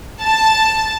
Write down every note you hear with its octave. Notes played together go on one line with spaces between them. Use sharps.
A5